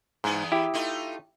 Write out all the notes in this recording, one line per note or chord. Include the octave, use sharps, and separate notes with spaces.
E2 G#2 E3 B3
E4 G4
A3 D#4 F4